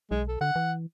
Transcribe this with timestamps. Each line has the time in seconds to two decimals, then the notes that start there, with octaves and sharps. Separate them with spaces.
0.11 B1 G#3
0.28 A4
0.41 D3 F#5
0.56 E3